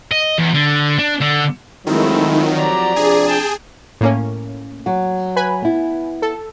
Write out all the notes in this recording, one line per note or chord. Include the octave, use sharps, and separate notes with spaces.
D#5
E2
D3
D4
D3
D#3 F3 F#3 G#3 A3 C4 E4
G4 D5 A#5
C3 F3 D4 G#4
G5 A5
A2 A#3 C#4
F#3 F#4
B4 G#5 B5
B3 E4
A4